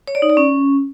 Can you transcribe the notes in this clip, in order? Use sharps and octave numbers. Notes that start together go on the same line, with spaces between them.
C#5
D5
D#4
D5
C#4